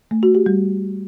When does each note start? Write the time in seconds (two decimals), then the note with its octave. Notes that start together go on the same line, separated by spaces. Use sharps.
0.11 A3
0.23 F#4
0.35 G4
0.46 G3